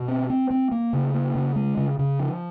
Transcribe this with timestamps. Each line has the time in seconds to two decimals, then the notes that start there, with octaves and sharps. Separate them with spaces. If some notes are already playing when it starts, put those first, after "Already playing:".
Already playing: B2
0.08 C4
0.30 C4
0.50 C4
0.71 A#3
0.93 C#3
1.14 A#3
1.35 C#3
1.56 G#3
1.77 C#3
1.99 C#3
2.19 F3